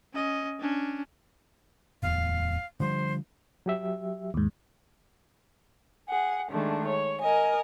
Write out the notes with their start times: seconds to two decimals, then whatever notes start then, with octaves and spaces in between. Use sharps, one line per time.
0.14 C#4 D#5
0.59 C#4 D4
2.03 D1 E2 F5
2.80 D3 F3 G3 C5
3.66 F#3 G4 E5
4.34 D#2 G#2
6.07 G#4 F#5
6.50 D#3 G#3 A3 D4
6.87 C#5
7.21 A#4 D#5 G#5